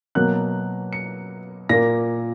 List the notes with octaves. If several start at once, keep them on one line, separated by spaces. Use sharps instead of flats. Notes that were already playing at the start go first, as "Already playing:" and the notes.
B2 F#3 A#3 F#6
C#7
A#2 A#3 A#6